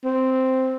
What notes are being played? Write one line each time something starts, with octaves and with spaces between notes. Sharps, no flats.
C4